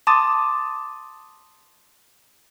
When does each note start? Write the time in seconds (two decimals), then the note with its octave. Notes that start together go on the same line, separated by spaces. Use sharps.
0.07 A5 C6 D6 D#6 A6 D#7